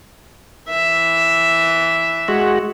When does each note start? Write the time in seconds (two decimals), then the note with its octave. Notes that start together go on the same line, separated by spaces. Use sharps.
0.70 E3 E5
2.28 G#3 F#4